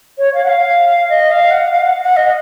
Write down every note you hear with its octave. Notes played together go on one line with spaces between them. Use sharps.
C#5
F5
F#5
F5
D#5
F5
F#5
F5
F#5
F#5
D#5